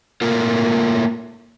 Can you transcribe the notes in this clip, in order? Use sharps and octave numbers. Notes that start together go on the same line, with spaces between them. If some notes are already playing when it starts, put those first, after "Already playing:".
A3 A#3 F4 A#4